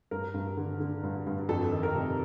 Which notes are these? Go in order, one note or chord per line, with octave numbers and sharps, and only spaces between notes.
G2 A#4
G2
D3
D3
G2
G2
F2 A4
D#3
A#4
C3